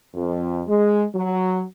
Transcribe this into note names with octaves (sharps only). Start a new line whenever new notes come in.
F2
G#3
F#3